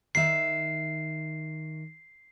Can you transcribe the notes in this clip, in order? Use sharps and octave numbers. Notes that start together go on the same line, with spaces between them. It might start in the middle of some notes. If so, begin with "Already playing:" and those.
D#3 E5 C7